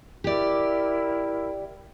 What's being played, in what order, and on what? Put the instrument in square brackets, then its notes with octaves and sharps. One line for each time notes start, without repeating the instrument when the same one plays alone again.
[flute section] E4 A#4 [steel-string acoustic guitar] G4 D5